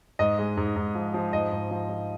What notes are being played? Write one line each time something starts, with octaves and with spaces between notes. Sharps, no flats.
G#2 D#5
G#3
G#2
G#2
F3
F3
G#2 D#5
G#2
F3
F3